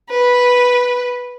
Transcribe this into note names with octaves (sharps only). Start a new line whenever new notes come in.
B4